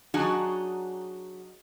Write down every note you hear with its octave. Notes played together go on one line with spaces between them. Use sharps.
F#3 D4 D#4 F#4 G#4